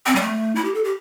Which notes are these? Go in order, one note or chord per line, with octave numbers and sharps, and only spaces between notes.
C4
G3
A3
E4
G4
A4
G4